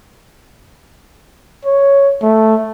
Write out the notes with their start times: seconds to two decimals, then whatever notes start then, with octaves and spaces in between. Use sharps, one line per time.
1.65 C#5
2.22 A3